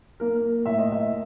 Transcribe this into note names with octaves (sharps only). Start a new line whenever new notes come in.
A#3 A#4
A2 E5
D#5
E5
A2